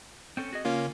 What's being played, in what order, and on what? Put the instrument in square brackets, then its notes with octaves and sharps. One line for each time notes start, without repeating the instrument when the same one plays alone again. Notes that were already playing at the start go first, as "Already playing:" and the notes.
[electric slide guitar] C4 C#4 A4
F#4 G#4 D#5
[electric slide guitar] C#3 [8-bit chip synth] A#3 C#4 F4